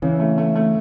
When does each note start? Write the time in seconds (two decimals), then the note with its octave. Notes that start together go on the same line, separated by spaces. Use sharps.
0.02 C#3 E3
0.20 A3
0.38 A3
0.55 A3